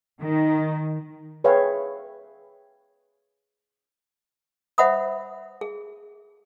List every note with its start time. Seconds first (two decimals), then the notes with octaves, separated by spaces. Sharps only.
0.21 D#3
1.44 G#4 B4 C#5 E5 F5 G5
4.78 C5 E5 F#5 B5 D#6
5.61 G#4